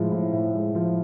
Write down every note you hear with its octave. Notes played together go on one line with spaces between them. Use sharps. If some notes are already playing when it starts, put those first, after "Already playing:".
Already playing: A2 F3 G#3
A2
A2
G#3
F3